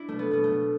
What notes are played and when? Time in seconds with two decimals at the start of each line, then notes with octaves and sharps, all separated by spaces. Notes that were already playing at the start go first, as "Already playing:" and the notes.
Already playing: D4 E4
0.09 B2 A3
0.19 B3
0.31 B2 B3
0.44 A3
0.50 B2